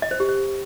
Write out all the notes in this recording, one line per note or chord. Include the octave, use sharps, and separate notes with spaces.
D#5
C5
G4
C5